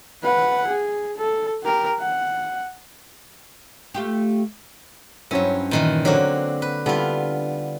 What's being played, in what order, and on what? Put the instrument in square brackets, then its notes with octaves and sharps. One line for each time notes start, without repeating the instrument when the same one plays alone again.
[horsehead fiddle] B4 F#5
G#4
A4
G4 A#4
F#5
[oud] A3 F4 G4
[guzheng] G2 C#4 [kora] F#3 C4 E4
[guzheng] A#2 D#3 E3
[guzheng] D3 C4 F#4 [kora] F#3 A#3
[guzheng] B4
[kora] D3 G3 E4 [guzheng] B3 F4